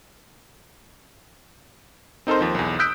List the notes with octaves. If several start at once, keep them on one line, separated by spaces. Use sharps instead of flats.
C4 D#4 A4 A#4 C5
D#2 F3
B1 E2
D#6 E6 F#6 G6 B6 D7